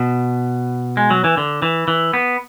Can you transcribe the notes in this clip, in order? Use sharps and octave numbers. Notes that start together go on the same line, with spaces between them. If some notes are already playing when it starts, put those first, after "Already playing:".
Already playing: B2
G#3
F#3
E3
D3
E3
E3
B3